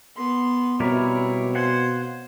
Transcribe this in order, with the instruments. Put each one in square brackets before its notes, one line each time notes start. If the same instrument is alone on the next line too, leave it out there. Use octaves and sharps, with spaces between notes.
[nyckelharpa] B3 C6
[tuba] B2 [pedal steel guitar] G3 E4 A#4 [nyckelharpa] C4 C#5
[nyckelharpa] C5 [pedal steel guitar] F5 F#5 G#5